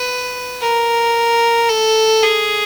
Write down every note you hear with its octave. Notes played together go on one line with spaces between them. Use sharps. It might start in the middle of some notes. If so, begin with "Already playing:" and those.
Already playing: B4
A#4
A4
G#4